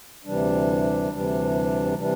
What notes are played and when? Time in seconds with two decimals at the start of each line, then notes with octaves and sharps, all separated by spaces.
0.25 D2 C3 E3 G3 D4
1.11 D2 C3 E3 G3 D4
1.97 C3 E3 G3 D4